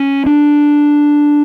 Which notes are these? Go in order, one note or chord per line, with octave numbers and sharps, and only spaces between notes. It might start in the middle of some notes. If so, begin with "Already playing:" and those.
Already playing: C#4
D4